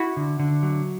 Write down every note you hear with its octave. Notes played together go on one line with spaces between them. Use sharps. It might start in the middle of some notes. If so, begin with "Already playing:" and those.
Already playing: E4 F#4
D3
D3
F#3